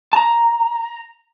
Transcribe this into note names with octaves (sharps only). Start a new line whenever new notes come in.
A5 A#5